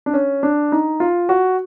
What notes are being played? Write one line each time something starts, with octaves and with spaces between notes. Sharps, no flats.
D4
C#4
D4
D#4
F4
F#4